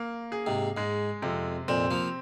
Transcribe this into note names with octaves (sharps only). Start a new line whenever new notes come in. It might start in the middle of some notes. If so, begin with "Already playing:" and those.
Already playing: A#3
G#4
G#2 C3
G#2 G#3
F2 C3
F2 A#2 C4
F3 A#3